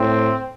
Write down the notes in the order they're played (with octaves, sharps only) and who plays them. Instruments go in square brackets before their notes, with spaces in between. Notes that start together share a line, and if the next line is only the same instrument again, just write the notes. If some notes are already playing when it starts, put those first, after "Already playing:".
Already playing: [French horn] A2 [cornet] C4